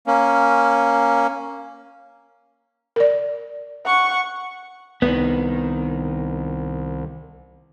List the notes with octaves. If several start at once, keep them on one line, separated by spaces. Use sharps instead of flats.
A#3 C#4
A#4 D5
F#5 C#6
C2 D#3 B3